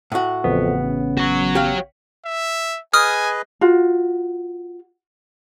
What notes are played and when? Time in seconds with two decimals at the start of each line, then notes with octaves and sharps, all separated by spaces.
0.12 A2 F#4
0.44 A1 F2 C#3 B3
0.84 C#4
1.18 F#4 C#5
1.55 G4 F5
2.25 E5
2.94 G#4 B4 D#5 G#5 D#6 F6
3.61 F4 F#4